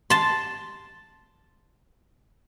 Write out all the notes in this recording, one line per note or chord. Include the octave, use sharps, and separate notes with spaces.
A5 C6